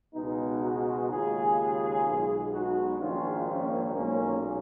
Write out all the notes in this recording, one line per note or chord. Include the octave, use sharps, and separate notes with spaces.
C#2 B2 G#3 B3 D#4
D#4 F#4
D#2 C#3 G#3 F4 G#4
B1 B2 G#3
D#4 F#4
A#1 G#2 D#3 G#3 C#4 F4
A#3 C#4
B1 A#2 G#3 A#3 C#4